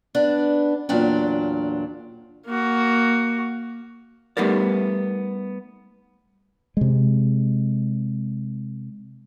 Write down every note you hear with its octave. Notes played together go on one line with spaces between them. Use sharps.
B3 D4
E2 A#2 F#3 D4 G5
A#3 F#4
G3 A3 B3 D#4 A#4 D5
C3 G#3